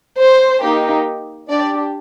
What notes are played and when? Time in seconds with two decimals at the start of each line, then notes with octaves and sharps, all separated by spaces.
0.18 C5
0.61 A#3 D#4 G4
1.49 D4 G4 D5